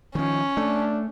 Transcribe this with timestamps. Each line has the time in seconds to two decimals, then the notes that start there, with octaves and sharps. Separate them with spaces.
0.15 D#3 F3 C#4
0.57 A3 D4